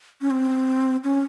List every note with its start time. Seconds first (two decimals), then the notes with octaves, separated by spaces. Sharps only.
0.21 C#4
0.31 C4
1.04 C#4